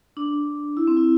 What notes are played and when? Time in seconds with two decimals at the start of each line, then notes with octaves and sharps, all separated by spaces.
0.17 D4
0.77 E4
0.87 C4
0.97 E4